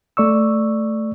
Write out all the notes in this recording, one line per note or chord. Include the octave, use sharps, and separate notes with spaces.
A3 D5 C#6 E6